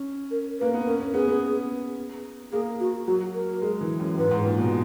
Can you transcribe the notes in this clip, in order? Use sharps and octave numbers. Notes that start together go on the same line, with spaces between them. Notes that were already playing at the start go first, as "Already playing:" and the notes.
Already playing: C#4
A#4
A#3 B4
B3
C#4 A#4
C#4
B3 G#4
B3
A#3 G#4
F#4
F#3 F#4
A#4
G#3
E3
F#2
G#2 B4
G#2
A#2
B2